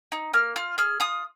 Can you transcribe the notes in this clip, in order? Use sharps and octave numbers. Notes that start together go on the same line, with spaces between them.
D#4
A#3 F6
F4 F6
G#4 F6
F4 D#6